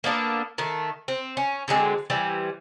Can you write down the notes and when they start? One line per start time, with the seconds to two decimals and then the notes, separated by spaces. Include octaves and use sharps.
0.04 A#3 B3 D4 A4
0.58 D#3 A3
1.08 C4
1.37 C#4
1.68 D3 F#3 G#3 C4
2.10 E3 G3 C4